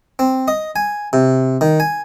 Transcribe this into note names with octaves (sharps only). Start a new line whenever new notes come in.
C4
D#5
G#5
C3
D#3
G#5